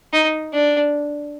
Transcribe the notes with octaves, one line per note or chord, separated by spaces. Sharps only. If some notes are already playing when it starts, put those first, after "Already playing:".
D#4
D4